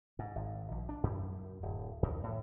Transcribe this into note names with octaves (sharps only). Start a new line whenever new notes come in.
G#2
G#1
A#1
D4
F#2
D1
D#2
A2